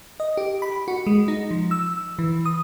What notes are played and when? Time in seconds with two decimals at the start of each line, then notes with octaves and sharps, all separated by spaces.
0.20 D#5
0.37 G4
0.62 B5
0.88 F#4
1.07 G#3
1.28 D#4
1.51 F3
1.71 E6
2.19 E3
2.45 D#6